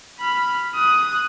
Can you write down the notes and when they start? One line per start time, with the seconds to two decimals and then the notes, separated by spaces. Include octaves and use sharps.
0.20 B5 F6
0.75 D#6 F#6